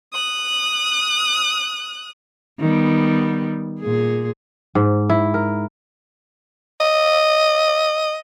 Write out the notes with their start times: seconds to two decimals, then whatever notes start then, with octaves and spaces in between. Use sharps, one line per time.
0.13 D#6 F#6
2.60 D#3 G3 B3
3.80 A#2 G#4
4.75 G#2
5.09 E4
5.34 A#4
6.80 D#5